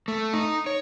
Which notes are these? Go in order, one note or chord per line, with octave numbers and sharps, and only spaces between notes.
A3
D#4
C#5